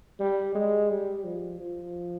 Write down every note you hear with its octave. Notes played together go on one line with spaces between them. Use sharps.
G3
G#3
G3
F3
F3